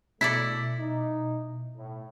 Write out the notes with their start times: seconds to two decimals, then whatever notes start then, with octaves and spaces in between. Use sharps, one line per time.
0.21 B2 A3 E4 A4 D5 B6
0.77 D#4
1.76 A2